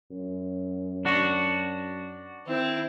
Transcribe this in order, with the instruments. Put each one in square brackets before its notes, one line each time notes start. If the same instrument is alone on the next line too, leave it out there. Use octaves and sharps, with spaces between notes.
[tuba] F#2
[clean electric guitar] D4 F#4
[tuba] D#3 [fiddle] C4 E4